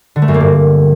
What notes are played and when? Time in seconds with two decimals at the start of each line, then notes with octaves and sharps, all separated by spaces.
0.16 D3
0.22 A3
0.28 F#2
0.34 A#3
0.40 G2